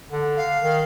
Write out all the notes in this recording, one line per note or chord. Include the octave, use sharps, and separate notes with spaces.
D3
F5
D#3